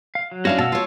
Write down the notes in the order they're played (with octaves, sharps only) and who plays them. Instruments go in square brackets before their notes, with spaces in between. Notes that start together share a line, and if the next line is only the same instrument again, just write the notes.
[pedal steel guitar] F5
F#3
[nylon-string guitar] C#4 D4 E4 [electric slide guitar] F#4 F5
[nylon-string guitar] B2 [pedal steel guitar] A5 E6
[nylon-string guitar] F4 C#5